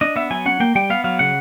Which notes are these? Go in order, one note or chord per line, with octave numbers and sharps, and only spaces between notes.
D4 D#5
B3 E5
F#3 G#5
C#4 F#5
A#3 G5
G3 G5
B3 F5
F#3 F5
C#3 F#5